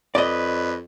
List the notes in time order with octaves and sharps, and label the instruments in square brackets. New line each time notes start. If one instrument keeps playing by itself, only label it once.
[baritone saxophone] F2 [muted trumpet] B4 [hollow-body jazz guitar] D5 D#5